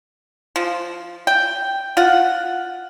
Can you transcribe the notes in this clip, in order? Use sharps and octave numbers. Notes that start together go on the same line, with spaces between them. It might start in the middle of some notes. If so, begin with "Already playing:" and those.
F3
G5
F4 F#5